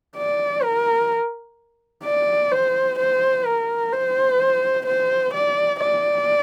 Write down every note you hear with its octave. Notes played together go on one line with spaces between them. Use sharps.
D5
A#4
D5
C5
C5
A#4
C5
C5
D5
D5